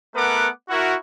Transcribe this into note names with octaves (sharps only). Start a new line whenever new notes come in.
A3 B3 A#4 B4 F#5 D6
E4 F#4 A#4